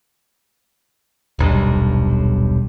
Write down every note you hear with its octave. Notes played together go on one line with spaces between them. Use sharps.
D#1 B1 G2